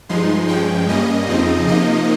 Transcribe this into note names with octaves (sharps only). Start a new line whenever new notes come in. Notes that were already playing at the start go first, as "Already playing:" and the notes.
G2 F3 G#3 D#4 C6
G2 F3 G#3 C#4 G5
G2 G3 A#3 C#4 D#5
F2 C#3 F3 C4 D#4
C3 F3 A#3 D#4 D#5